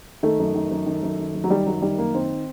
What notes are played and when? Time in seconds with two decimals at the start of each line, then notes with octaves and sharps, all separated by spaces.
0.23 D#3 A3
0.39 F#2
0.55 D#3
0.71 F#2
0.86 D#3
1.03 F#2
1.19 D#3
1.35 F#2
1.44 F#3
1.50 D#3 G3
1.66 F#2 F#3
1.82 D#3 G3
1.98 F#2 A#3
2.14 D#3 C4